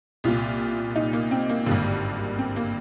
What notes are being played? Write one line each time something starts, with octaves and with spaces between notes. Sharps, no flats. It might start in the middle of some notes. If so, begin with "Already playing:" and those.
C2 A#2 F4
D#4
A#3
C4
A#3
G#1 G2 D3 A#3
C4
A#3